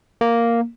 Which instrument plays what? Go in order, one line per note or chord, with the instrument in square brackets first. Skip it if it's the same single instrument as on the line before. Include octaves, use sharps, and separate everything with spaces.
[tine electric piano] A#3